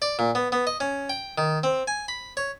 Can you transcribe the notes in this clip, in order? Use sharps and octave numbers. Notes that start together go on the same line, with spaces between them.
D5
A#2
B3
B3
D#5
C#4
G5
D#3
C4
G#5
B5
C#5